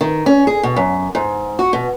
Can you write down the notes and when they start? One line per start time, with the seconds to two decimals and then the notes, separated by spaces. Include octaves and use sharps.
0.01 D#3
0.26 C#4
0.47 G#4
0.63 B2
0.76 F#2
1.15 G#2
1.59 F#4
1.73 B2